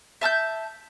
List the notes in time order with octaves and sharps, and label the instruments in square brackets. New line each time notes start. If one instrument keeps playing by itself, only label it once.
[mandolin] E5 A5 F6 G6